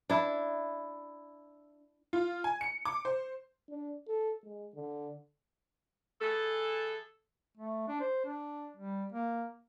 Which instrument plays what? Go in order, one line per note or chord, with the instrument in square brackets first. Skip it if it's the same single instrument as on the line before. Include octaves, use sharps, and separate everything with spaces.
[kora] D4 E4
[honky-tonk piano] F4
G#5
C#7
D6
C5
[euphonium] D4
A4
G#3
D3
[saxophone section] E3 G#4 A4
[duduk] A3
D4
C5
D4
G3
A#3